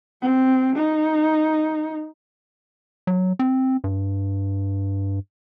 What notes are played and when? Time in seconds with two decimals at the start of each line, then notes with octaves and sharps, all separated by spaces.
0.21 C4
0.76 D#4
3.07 F#3
3.39 C4
3.84 G2